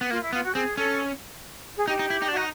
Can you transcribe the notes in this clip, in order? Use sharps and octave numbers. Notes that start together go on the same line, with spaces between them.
B3
A#3 F4
E4
B3 F4
F#4
C4 G#4
C#4 A4
G#4
D#4 G4
D#4
E4
D#4
D4
D#4 F#4